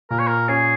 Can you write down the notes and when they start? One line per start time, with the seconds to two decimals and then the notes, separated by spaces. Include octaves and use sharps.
0.10 A#2 A#4
0.19 C#5
0.27 A#4
0.48 C#4 G#4